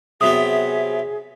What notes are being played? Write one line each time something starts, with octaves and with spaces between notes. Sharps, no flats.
C3 F#3 B3 G#4 E5 D#6